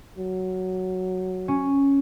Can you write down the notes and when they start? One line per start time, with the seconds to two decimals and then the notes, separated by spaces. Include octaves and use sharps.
0.18 F#3
1.48 C#4